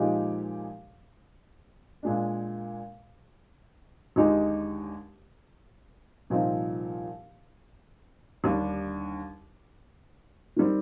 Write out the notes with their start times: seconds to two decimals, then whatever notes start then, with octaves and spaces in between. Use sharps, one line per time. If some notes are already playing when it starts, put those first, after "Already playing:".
Already playing: A#2 F3 G#3 D#4 G4
2.03 A#2 G#3 D4
4.16 D#2 D3 G#3 D#4 G4
6.30 C2 A#2 F3 C4 D#4
8.44 D#2 D3 G3 D4
10.56 D#3 G3 C4